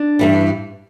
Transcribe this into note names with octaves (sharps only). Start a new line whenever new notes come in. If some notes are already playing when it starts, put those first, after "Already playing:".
Already playing: D4
G2 E3 G3